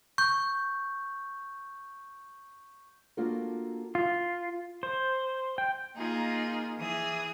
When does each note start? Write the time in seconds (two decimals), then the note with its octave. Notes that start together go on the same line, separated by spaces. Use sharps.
0.18 C#6 G6
3.17 A#3 D4 F4 F#4 A4 A#4
3.95 F4
4.83 C5
5.58 G5
5.95 A#3 D#4 F4 G#4 A#4
6.78 E3 G#4 D#6